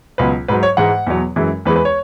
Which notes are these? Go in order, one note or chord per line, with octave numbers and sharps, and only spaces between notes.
C#2 B2 F#3 B4
G#2 F#3 B4
C#5
G#2 E3 G#3 F#5
E2 B2 F#3
F#2 E3 G#3
E2 E3 G#3 B4
B4
C#5